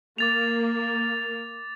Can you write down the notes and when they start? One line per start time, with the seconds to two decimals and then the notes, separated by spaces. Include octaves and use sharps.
0.18 A#3 D6 A6 F7